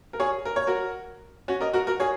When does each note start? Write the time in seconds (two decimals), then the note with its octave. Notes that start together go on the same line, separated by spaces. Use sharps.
0.13 A#4
0.20 G#4 C#5
0.45 A#4
0.56 C#5
0.67 F#4 A#4
1.48 C#4 F#4
1.61 A#4 D#5
1.73 F#4 A#4
1.87 F#4 A#4
2.00 G#4 C#5